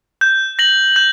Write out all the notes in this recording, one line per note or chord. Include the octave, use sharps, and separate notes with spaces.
G6
A#6 F#7
G6